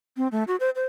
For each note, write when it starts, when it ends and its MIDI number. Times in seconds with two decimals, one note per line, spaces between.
0.17 0.28 60
0.32 0.43 57
0.48 0.56 66
0.60 0.70 72
0.76 0.86 72